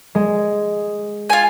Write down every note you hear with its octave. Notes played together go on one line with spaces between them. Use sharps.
G#3
F4 G#5